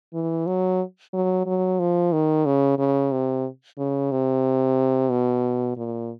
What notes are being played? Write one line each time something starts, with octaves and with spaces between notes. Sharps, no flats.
E3
F#3
F#3
F#3
F3
D#3
C#3
C#3
C3
C#3
C3
B2
A#2